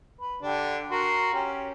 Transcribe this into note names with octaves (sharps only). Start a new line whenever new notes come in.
B4
D3 D4 G4
F#4 A#4 C6
C#4 G4